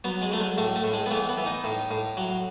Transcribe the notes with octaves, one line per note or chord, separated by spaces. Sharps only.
F#3 B3
G#3
F#3 A3
G#3
A2 A3
A3
A2
G#3
B3
E3 A3
B3
E3
D#4
A2
A2
F#3